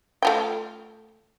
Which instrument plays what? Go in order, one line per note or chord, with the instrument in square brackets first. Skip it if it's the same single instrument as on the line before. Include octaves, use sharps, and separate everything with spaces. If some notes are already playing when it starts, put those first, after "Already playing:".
[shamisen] A3 F4 G5